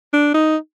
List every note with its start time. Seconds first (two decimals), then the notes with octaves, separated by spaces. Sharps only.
0.14 D4
0.34 D#4